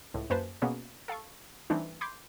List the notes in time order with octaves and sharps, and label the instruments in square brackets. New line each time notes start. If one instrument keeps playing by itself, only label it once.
[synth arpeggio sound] C#2 A2
F#2 A#3 B4 C5 G#5 A5
B2 A#3 B3 C#4 G#4
A4 F5 A5 C#6
E3 G3 A3 C4 D4 D#4
B5 C6 D6 G6 G#6 C7